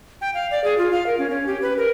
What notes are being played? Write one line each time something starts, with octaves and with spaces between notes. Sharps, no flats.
G5
F5
D5
G#4
F4
F5
A#4
C#4
C#4
G4
B4
A#4